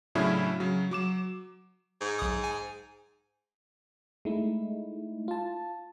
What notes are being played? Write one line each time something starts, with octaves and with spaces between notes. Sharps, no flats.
A2 C#3 F#3 C#4 D4 E4
C#3 F#3
F#3 D6 E7
G#2
B1 D#6
G#5
G#3 A3 D#4 E4
F4 A5